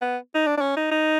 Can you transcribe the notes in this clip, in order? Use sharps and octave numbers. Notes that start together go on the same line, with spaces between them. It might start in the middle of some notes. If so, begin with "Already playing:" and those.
B3
D#4
D4
D4
C#4
D#4
D#4